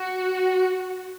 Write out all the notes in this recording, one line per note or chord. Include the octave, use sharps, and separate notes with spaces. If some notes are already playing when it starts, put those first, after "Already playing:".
Already playing: F#4